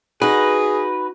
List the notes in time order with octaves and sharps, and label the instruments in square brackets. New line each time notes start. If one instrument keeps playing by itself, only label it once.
[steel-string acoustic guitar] D#4 F#4 [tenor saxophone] G#4 [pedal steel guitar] B4